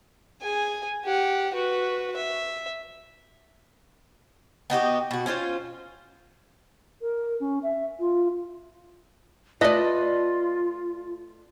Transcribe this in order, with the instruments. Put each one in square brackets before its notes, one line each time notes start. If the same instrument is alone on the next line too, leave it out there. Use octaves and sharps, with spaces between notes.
[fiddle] G#4 G#5
G4 F#5
F#4 B4
E5
[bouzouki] B3 D#4 F#4 G4
B2 F#4
C#4 D4 F4 C5
[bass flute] A#4
C#4
E5
F4
[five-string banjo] A3 B4 [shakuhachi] F4 [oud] D5 D#5